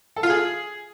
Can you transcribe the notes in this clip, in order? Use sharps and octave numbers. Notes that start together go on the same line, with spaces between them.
A4
F4
G#4